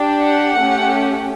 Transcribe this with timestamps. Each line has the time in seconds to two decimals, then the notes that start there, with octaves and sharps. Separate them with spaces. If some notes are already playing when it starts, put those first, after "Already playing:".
Already playing: D4 G4
0.23 F#5
0.58 A3 C#4 G4